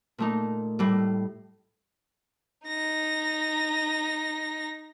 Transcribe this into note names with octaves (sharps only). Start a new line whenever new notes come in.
A#2 A3 D#4
A2 G3
D#4 A#6